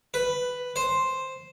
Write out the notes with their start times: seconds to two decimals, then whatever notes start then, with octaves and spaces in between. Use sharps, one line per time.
0.14 B4
0.76 C5